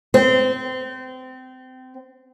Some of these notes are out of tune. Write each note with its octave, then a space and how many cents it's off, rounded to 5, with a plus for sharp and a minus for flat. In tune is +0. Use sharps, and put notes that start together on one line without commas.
C4 -25